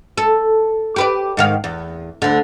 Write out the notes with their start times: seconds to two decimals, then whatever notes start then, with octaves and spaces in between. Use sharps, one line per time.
0.18 A4
0.96 G4 B4 D5
1.37 G#2 D#3 F5
1.64 E2
2.22 D2 D3